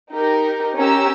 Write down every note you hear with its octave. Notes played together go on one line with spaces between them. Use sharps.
D#4 G4 A#4
C#4 G4 A#4 A#5 E6